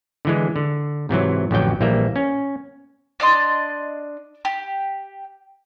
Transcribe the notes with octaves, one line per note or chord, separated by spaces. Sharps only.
D3 E3 G#3
D3
G#2 C3 E3 F#3
A1 F2 D3 F#3 G5
A#1 E3 G3 A#3 E5
C#4
D4 D5 D#5 C6
G4